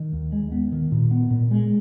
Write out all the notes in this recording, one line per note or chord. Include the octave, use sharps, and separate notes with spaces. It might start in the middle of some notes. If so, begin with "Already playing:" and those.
Already playing: D#3
D#2
G#3
B3
D#3
A#2
B3
A#2
G#3